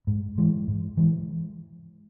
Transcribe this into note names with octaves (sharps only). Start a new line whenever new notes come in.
G#2
E3 G#3
G#2
E3 G#3